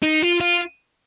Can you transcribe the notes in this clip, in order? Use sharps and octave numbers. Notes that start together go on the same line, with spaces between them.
D#4
F4
F4